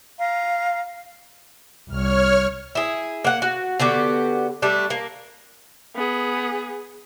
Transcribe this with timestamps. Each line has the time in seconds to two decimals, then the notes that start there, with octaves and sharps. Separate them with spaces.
0.19 F5 A#5
1.89 C2 C#5 F6
2.75 E4 G#4
3.24 A#3 F#5
3.42 F#4
3.79 D3 B3 F#4 G4
4.62 G3 A3 D4
4.90 A#3
5.95 B3 G#4